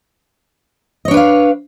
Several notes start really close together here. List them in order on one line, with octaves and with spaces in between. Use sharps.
D#5 C#5 D4 B4 F5